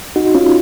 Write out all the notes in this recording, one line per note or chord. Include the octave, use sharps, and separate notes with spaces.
D#4 F#4
C#4 F4